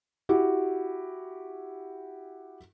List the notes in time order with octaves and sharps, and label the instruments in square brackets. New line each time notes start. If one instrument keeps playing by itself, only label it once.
[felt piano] E4 F#4 G4